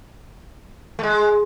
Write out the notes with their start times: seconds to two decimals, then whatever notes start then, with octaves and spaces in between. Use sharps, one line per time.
0.99 A3
1.03 G#3